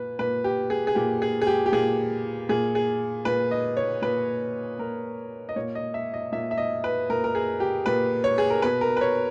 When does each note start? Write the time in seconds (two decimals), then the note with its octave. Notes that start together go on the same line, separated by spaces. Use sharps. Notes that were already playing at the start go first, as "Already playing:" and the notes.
Already playing: A#2 B4
0.19 A#2 B4
0.44 G4
0.70 G#4
0.87 G#4
0.95 A#2 G4
1.22 G#4
1.42 G#4
1.47 G4
1.66 G4
1.72 A#2 G#4
2.49 A#2 G#4
2.75 G#4
3.25 A#2 B4
3.51 D#5
3.77 C#5
4.02 A#2 B4
4.79 A#2 A#4
5.49 D#5
5.56 A#2 C#5
5.75 D#5
5.94 E5
6.14 D#5
6.32 A#2 E5
6.51 E5
6.58 D#5
6.84 B4
7.10 A#2 A#4
7.24 A#4
7.35 G#4
7.60 G4
7.86 A#2 B4
8.24 C#5
8.38 G#4
8.50 A#4
8.62 B2 B4
8.81 A#4
8.97 B4
9.01 C#5